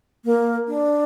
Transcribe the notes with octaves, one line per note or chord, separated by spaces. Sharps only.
A#3
D4